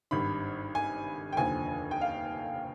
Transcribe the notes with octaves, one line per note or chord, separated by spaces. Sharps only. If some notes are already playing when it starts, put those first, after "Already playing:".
G#1 G2 D#3 B5
G#5
G5
F1 D#2 D3 F3 G#5
G5
F5